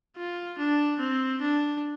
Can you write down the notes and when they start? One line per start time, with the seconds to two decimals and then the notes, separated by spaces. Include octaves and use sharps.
0.17 F4
0.58 D4
0.99 C4
1.41 D4